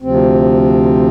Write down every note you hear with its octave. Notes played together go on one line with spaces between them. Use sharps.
D2 C3 F3 C4